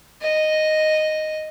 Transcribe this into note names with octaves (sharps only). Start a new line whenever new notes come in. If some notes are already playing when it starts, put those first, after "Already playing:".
D#5